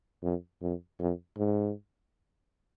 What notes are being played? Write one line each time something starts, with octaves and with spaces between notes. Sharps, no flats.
F2
F2
F2
G#2